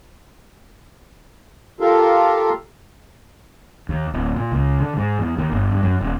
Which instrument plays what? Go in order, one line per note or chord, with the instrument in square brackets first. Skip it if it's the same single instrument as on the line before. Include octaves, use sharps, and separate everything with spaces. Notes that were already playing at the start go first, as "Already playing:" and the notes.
[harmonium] F4 G4 A4 A#4 F5
[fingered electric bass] D#2
D1
A#2
C#2
D3
G#2
E2
D#2
G1
G2
F#2
D#1